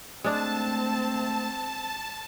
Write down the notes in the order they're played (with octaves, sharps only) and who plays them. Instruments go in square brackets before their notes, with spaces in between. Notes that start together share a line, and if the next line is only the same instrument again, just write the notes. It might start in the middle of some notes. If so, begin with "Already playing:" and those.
[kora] G#3 D4 [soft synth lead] A3 [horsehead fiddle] C4 [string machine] A5